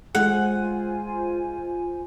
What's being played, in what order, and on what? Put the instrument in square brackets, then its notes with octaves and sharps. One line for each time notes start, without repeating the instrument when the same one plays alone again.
[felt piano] G#3 [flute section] F4 C5 G#5 [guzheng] F#5